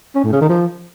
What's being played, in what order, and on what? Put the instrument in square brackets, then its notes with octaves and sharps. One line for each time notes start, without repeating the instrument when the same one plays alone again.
[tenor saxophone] C#4
A2
C#3
D#3
F3